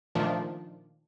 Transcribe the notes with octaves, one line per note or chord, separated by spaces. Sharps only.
A#2 D#3 F3 A3 D4